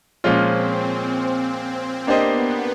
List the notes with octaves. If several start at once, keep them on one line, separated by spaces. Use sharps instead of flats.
A#2 F3 G#3 C4 C#4 F4
A#3 B3 D4 G4 C5 D#5